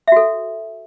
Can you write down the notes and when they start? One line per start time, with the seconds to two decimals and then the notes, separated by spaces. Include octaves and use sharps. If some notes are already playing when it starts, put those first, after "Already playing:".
0.08 E5
0.12 F#4
0.16 A4